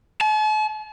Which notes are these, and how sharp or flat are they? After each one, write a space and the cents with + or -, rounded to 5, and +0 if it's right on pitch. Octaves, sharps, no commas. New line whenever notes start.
A5 -45